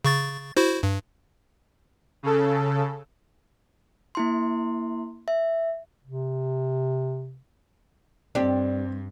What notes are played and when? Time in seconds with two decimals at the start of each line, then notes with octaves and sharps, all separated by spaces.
0.05 C#3 C#6 A6
0.57 E4 F#4 C5
0.83 G2
2.23 C#3 A4
4.15 A#3 E4 C6
5.28 E5
6.04 C3
8.35 G2 C4 D4 G4